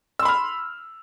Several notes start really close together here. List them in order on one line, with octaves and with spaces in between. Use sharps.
E6 C6 B5 F6